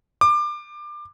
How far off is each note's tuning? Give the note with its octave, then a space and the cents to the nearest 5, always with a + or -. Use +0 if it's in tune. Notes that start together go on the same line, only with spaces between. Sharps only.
D6 +25